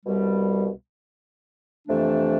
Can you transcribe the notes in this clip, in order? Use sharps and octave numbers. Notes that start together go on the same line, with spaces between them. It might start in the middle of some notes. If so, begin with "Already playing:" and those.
C2 B2 G3
F2 C3 E3 A3 D4